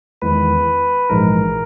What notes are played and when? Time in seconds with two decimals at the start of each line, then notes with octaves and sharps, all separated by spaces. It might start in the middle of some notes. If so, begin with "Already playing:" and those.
0.22 E2 D#3 G#3 B3 E4 B4
1.09 A#1 G#2 E3 G#3 A#4